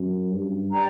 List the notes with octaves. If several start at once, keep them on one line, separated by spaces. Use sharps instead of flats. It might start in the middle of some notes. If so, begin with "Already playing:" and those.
Already playing: F#2
G2
D5 G5 A#5